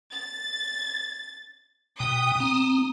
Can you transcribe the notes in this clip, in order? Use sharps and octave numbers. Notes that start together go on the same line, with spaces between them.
A6
B2 G5 D#6
C4 A#5